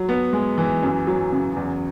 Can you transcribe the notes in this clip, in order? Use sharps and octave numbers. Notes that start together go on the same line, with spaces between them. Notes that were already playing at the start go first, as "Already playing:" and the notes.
Already playing: F#3
B3
G#3
E3
F#2
F#3
C#3
E2